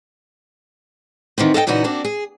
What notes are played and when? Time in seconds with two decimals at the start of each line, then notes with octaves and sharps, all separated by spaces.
1.38 D#3 E3 B3 C4
1.54 A4 D#5 F5 G5
1.67 A#2 C#3 E3 D#4 F#4
1.84 A#3 C4 D4 F#4
2.05 G#4